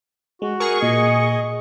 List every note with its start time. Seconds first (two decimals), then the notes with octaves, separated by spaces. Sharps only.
0.42 G#3 F#4
0.60 G#4 A#4 C#6 F6
0.82 A#2 D#5